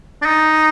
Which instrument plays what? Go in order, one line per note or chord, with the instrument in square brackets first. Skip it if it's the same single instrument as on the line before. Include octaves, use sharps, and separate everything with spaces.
[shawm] D4
D#4